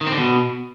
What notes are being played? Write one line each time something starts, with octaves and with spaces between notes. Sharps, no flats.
D#3
C4
D3
B2